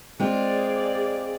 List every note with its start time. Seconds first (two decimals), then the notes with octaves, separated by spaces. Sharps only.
0.20 G#3 C4 F4 G#4 D5